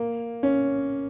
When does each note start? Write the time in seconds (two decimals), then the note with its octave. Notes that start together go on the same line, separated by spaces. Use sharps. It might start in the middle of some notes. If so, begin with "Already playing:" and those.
Already playing: A#3
0.43 C#4